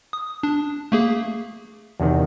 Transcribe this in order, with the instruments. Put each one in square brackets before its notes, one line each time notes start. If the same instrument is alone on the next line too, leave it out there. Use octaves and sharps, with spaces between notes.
[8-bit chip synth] D#6
D4
A3 A#3 G#4
[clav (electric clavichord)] E2 C3 D#3